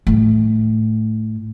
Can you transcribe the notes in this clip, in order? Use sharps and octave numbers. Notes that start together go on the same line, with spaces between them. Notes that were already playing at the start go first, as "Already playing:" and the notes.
A2